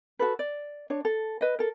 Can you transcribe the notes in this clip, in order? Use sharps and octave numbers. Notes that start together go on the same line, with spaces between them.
F#4 A4 B4
D5
D4 C#5
A4
B4 D#5
A4 A#4